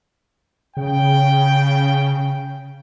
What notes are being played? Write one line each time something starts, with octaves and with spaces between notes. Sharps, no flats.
C#3 G5